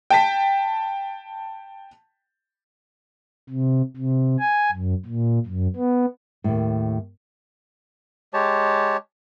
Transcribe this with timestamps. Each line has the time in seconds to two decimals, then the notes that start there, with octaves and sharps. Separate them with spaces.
0.10 G5 A5 B6
3.50 C3
3.97 C3
4.40 G#5
4.72 F#2
5.05 A#2
5.46 F#2
5.76 B3
6.44 D#2 A2
8.33 G#3 G4 C#5 A5